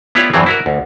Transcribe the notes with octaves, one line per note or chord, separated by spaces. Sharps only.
B3 E4 F4 G4 C#5 D5
E2 G2 E3 F#3 C4
E4 F#4 A#4
D2